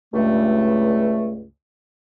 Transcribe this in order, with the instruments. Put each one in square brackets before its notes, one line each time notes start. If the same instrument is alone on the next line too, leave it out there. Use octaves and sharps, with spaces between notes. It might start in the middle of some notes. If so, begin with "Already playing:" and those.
[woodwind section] C#2 G2 A3